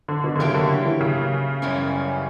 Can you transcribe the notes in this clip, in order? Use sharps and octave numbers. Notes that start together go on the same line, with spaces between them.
D3
B2
D3
C#3 F#3 A#3 E4 G4
D3
E3
C#3
F#2 E3 G3 C#4 G4